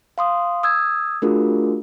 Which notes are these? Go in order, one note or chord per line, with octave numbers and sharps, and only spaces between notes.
F5 C6 D#6
D#6 E6 G#6
A3 D4 F4 F#4 G#4 A#4